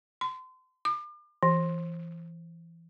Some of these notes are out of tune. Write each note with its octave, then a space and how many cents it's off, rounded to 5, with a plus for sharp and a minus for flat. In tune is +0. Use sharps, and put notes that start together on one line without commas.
C6 -30
D6 +40
E3 +20